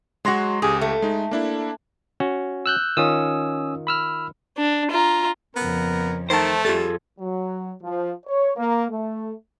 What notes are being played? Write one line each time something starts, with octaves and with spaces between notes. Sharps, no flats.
F#3 G#3 F#4 C6 A#6
C#2 G4 G#4
A3
G#3 D#4
A#3 D4 E4
C#4 F#4
E6 F#6 G6
D#3 C#4 F4 D#6 E6
B5 E6 F6
D4
F4 A#5
F2 C#3 B3 A#4
D#3 A3 C5 G5 A5
F2 G3 F4 G#4 A4
F#3
F3
C#5
A#3
A3